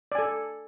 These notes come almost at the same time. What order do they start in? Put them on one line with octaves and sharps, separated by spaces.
D5 G#5 A4